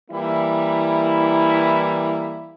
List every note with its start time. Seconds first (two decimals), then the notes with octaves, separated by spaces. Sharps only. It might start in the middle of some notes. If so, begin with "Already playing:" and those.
0.11 E3 G3 A#3 E4